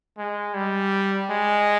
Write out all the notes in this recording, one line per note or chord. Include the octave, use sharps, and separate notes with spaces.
G#3
G3
G#3